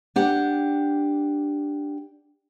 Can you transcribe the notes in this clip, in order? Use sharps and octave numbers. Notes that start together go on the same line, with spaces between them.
D4 G4 F#5